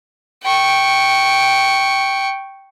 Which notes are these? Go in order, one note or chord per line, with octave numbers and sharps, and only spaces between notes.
G5 C#6